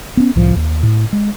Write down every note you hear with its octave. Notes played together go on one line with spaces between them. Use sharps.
B3 C#4
C2 A2 F3
D#2
A2
G#3